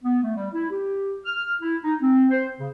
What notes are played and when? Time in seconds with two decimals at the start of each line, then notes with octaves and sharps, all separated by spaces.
0.03 B3
0.24 A3
0.36 G3
0.54 E4
0.71 G4
1.25 F6
1.62 E4
1.83 D#4
2.02 C4
2.31 C5
2.60 C#3